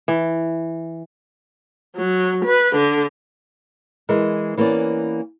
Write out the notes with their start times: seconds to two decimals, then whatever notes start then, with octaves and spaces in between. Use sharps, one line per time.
0.08 E3
1.96 F#3
2.45 B4
2.76 D3
4.09 E3 G#3 A#4
4.57 E3 A#3 B3 C#4 D5